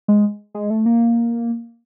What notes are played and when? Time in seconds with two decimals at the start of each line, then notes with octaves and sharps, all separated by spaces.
0.08 G#3
0.55 G#3
0.70 A3
0.86 A#3